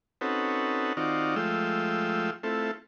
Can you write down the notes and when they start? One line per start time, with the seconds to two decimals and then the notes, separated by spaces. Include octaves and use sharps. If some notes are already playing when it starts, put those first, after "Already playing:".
0.21 C4 C#4 D#4 F#4 A4 B4
0.97 D#3 C4 D#4 F4 F#4 D5
1.36 F3 G#3 A3 F4 G5 E6
2.43 A3 C4 E4 F4 A4